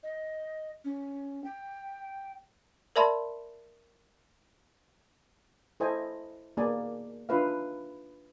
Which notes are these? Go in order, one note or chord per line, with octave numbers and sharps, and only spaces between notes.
D#5
C#4
G5
A#4 D5 E5 A5 B5 C6
E4 A4 C5 D#5 G#5
A#3 B3 D#4 G#4 D5 G#5
D4 D#4 F4 B4 E5 F5